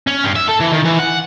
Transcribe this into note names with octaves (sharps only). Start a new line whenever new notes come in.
C#4
G2
E5
A4
E3
D#3
E3
F#5